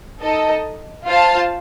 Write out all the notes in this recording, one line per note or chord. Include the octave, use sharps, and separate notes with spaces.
D#4 A4 D#5
F4 C5 F5 A5